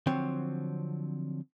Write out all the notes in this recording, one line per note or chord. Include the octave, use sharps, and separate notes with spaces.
D3 F3 F#3 C4 C#5